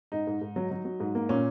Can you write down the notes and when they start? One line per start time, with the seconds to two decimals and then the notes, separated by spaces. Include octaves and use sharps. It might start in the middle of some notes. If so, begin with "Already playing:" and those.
0.12 G#2 D#4
0.27 G#2
0.41 G#2
0.56 F#3
0.71 F#3
0.85 F#3
1.00 G#2
1.15 A#3
1.29 A#2 C#4